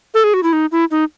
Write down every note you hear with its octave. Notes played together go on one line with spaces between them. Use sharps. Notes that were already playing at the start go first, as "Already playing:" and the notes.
A4
G#4
F#4
E4
D#4
E4
D#4